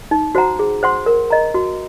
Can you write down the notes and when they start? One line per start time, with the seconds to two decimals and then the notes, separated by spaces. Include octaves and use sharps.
0.11 D#4
0.35 F#4 C5 F#5 A#5
0.59 G#4
0.83 C5 F#5 C6
1.06 A#4
1.30 D#5 A#5
1.55 F#4